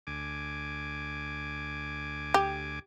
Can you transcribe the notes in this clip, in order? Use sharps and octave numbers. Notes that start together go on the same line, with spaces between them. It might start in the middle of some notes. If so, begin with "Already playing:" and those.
D2 G#5 D6
G4